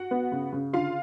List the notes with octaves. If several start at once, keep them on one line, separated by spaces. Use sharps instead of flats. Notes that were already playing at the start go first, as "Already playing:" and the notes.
Already playing: F#4 F#5
B3
C#3
C#3
D3 F4 F5